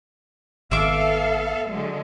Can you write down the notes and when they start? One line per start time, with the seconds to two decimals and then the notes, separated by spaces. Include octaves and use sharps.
0.71 G#1 D#3 B3 A4 E5 F5 D6
1.70 D3 F#3 G#3